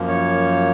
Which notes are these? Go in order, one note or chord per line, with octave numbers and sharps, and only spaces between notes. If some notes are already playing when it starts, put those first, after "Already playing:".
Already playing: F#2 F3 A#3
C#5